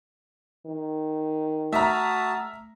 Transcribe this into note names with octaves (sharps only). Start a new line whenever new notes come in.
D#3
A3 F#4 E5 A5 A#5 D#6 F6